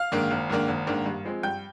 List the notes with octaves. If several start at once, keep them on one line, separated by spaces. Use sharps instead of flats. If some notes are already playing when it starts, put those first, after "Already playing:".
Already playing: F5 F6
G#2 D#3 A#3 D4
G#1
G#2 D#3 A#3 D4
G#1
G#2 D#3 A#3 D4
G2
F3 G#3 C4
G2 G5 G6